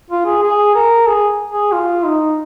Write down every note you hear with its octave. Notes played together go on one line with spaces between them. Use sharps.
F4
G#4
G#4
A#4
G#4
G#4
F4
D#4